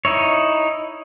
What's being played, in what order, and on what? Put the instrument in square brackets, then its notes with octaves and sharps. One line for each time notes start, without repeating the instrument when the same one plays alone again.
[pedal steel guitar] D#4 E4 C#5